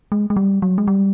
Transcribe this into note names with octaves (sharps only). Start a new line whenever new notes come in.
G#3
G#3
G3
F#3
G#3
G3